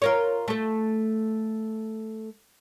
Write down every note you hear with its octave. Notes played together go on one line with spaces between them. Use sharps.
F4 A#4 C#5
A3 A4